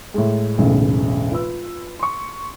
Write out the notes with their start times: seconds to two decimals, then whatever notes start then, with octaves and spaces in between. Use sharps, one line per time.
0.14 A2 G#3
0.58 E1 B1 A2 C#3
1.32 F4 B4 E6
1.99 C6 C#6